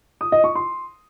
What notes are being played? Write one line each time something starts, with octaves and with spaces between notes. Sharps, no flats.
D#6
D#5
C#6
C6